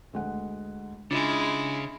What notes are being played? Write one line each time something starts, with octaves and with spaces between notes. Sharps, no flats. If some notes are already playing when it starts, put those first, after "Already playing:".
D2 G#3 F#5
C#3 G#3 D4 E4 F4